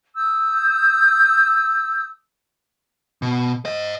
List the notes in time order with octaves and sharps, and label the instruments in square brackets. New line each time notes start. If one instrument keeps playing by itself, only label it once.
[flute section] D#6 E6 G6
[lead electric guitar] B2
C5 D#5